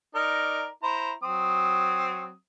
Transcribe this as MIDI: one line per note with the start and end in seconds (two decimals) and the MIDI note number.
0.15 0.67 63
0.15 0.67 70
0.15 0.67 74
0.83 1.11 64
0.83 1.11 72
0.83 1.11 82
1.23 2.33 54
1.23 2.33 60
1.23 2.33 87